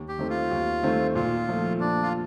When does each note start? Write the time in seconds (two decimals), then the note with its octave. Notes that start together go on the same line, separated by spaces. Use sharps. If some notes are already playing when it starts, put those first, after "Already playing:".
Already playing: D#2
0.08 G4
0.19 D#3 A3 C4
0.30 F4
0.51 D#2
0.83 D#3 A3 C4
1.15 A#2 F4
1.48 F3 A3
1.80 A#2 D4
2.03 F4